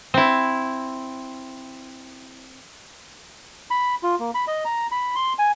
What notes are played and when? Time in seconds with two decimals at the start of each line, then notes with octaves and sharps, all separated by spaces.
0.14 C4 E4
3.71 B5
4.03 F4
4.19 A#3
4.35 B5
4.48 D#5
4.65 A#5
4.92 B5
5.15 C6
5.39 G#5